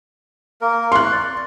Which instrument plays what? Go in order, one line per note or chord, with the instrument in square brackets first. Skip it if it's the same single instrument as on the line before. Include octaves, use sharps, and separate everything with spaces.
[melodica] A#3 A#4
[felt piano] C6 F#6 [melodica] C#6
[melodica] D5